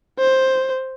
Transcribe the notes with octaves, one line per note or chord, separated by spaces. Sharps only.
C5